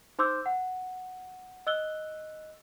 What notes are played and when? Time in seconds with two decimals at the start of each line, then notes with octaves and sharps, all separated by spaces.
0.19 D#4 C5 C6 D6 E6 G6
0.46 F#5
1.67 D#5 E6 F#6 G7